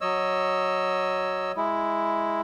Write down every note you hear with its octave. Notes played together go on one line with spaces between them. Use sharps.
F#3 C#5 D#5 E6
G#3 E4